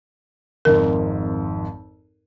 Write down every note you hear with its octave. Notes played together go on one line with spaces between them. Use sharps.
G#1 F2 G#2 A#4